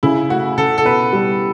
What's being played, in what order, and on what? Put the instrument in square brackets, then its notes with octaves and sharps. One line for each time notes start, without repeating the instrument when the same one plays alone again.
[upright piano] C#3 [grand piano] E4
[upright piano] A3 [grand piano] F#4
[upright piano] C#3 [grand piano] A4
[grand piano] A4
[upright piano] B2 [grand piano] B4
[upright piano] G3